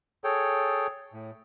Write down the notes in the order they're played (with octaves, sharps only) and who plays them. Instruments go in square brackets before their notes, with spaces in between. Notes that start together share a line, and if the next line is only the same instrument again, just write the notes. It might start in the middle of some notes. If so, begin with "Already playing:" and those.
[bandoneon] G#4 A4 C#5 G5
A2